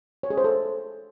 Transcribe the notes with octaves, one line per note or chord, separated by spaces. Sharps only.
C#5
G#4
C5
A4